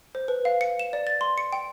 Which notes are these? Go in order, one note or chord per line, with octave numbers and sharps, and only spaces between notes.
C5
B4
F5
C#7
E7
D5
A6
C6
C#7
G5